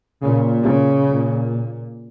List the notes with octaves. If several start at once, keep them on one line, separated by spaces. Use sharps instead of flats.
A#2 C#3
C#3
A#2